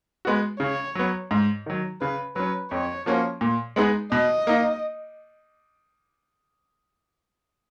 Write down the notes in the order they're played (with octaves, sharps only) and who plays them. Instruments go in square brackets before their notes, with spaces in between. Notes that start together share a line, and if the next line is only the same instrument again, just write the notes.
[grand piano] G#3 B3 F#4
[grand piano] C#3 [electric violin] C#5
[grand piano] F#3 B3
G#2
D#3 F#3
[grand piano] C#3 [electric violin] B4
[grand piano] F#3 C#4 [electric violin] B4
[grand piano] F2 [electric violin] C#5
[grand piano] F3 A#3 C#4 F#4
A#2
G#3 B3 D#4 G#4
[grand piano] B2 [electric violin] D#5
[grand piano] A#3 D#4